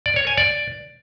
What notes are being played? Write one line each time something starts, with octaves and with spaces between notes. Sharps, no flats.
D5
C#5
G#5
D5